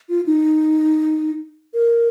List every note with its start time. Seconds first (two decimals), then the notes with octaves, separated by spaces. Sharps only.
0.09 F4
0.26 D#4
1.74 A#4